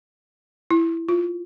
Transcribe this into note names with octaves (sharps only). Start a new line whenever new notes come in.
E4
F4